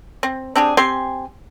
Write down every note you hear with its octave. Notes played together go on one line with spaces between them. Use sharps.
C4
C4 D4 G4 G#4
C4 G4 G#5 C6